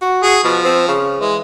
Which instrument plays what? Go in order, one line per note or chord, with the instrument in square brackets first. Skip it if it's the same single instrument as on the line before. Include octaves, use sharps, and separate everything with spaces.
[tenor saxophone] F#4
[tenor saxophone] F#4 [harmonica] G#4
[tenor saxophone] B2 [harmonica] F3
[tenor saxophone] C4
C#3
[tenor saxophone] E3 [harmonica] G#3